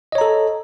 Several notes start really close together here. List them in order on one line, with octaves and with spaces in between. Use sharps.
D#5 C#5 A#5 A4